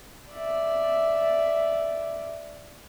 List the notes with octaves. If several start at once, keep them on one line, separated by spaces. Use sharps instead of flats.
D5 E5